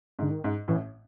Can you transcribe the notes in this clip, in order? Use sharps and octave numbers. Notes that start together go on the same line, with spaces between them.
G#2
D3
D#3
G#2
A1 A2 E3